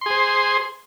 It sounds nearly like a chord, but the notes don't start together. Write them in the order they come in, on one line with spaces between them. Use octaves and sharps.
C6 G#4 C5